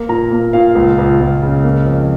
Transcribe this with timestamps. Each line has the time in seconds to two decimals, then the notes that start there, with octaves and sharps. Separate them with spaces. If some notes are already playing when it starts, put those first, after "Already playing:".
Already playing: A#3
0.09 A#2 A#5
0.31 A#3
0.53 A#2 F5
0.75 C#2
0.98 C#2
1.20 C#2
1.42 C#3
1.64 A#3
1.86 F2